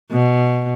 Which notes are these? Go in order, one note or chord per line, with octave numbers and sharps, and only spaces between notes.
B2